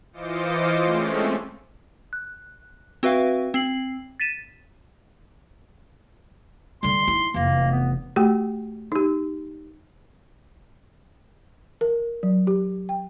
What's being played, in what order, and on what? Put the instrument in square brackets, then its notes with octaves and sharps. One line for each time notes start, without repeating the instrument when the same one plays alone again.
[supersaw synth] E3 F4 C5 D#5 D6 C#7
G#3 A3 C4 C#4
[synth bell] F#6
C4 F#4 B4 E5 F5
C4 C7 F#7
A6 B6 D#7 E7
[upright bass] D3 G3 [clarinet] C6
[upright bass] D#4 E4
[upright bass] F1 E3 [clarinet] A#3
[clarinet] B3
[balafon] A3 F#4 G4 G5
D#4 G4
A#4
F#3
G4
G5